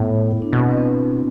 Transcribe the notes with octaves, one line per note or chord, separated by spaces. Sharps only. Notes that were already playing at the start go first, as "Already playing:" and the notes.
Already playing: A2 B3
E4
D4
B2 C4
C4
B3